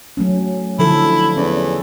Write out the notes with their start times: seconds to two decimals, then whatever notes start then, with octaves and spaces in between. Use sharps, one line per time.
0.17 F#3 A3 C#4
0.79 D3 F3 E4 A4
1.37 E2 C#4